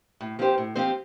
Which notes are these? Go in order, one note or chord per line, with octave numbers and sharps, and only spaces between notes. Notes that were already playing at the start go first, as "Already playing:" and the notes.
A2
F3 C4 G4 C5
A2
F3 C4 G4 C5